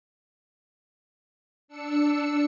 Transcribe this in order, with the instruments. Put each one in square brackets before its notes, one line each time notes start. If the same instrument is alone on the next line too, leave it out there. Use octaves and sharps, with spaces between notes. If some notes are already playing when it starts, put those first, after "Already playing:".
[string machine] D4 E6 C#7